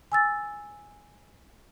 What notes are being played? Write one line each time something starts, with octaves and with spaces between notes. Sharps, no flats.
G#5 E6 A6